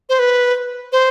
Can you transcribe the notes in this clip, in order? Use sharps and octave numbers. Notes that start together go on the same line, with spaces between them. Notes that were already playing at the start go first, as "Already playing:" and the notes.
C5
B4
C5